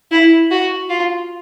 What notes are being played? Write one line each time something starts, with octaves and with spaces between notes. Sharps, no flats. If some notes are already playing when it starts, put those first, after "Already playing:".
E4
F#4
F4